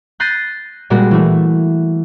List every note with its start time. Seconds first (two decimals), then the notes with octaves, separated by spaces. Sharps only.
0.20 F#6 G6 A6 A#6 C7 D#7
0.90 A#2 G3 G#3 F#4
1.11 E3 A3